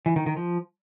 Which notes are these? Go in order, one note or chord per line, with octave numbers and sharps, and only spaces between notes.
E3
D#3
D#3
F3